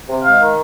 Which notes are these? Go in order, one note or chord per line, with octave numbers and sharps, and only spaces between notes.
C3
G#3 F5
D#3